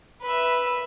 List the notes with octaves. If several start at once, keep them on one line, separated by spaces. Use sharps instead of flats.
B4 E5